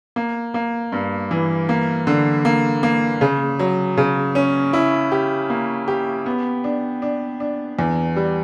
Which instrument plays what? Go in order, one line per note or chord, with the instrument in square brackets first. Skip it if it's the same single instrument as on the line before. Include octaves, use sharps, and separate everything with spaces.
[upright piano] A#3
A#3
G2
E3
A#3
D3
A#3
A#3
C#3
F#3
C#3
C#4
E4
G4
A#3
G4
B3
D4
D4
D4
E2
G3